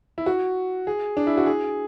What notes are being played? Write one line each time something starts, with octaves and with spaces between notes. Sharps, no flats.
E4
F#4
G#4
D4
E4
F#4
G#4